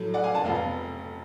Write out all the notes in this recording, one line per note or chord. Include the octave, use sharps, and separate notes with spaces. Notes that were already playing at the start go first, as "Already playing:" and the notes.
Already playing: A2 F#3 A3
D5 F#5
F5 G#5
F#5 A5
F1 F2 F3 B3 F5
F5